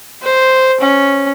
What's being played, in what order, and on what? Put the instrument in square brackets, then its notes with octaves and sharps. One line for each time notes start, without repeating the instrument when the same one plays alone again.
[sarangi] C5
C#4